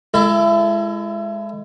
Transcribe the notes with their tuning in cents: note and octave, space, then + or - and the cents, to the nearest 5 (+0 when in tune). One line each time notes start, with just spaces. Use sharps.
G#3 +0 E4 +35 A4 +0